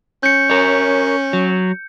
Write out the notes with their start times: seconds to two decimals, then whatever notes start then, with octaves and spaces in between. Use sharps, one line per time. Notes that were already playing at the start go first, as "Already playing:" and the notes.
0.23 C#4 G6 C#7
0.50 A#4 C#5
1.33 F#3